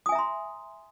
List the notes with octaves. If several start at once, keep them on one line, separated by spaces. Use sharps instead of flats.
E5 G#5 A#5 C6 D#6